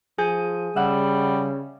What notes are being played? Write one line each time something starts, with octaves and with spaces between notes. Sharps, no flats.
F3 G#4 G#5 G6
C#3 G3 E5 F#5